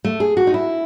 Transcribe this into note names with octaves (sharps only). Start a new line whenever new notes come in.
A3
G#4
F#4
D#4
E4